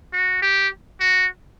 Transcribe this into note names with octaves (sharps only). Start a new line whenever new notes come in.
F#4
G4
F#4